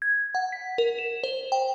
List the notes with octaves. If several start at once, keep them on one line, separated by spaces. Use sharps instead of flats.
G#6
F#5
B6
A#4
E7
C5
G5